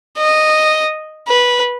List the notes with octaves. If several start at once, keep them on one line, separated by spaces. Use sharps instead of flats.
D#5
B4